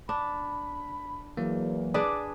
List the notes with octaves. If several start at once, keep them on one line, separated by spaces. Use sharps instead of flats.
D4 B5
E2 E3 F#3 A#3
D4 G#4 B4 D5